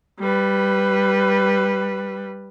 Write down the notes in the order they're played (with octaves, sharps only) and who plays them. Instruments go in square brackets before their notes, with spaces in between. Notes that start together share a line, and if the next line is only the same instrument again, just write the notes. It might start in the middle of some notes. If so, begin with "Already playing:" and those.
[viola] G3 B4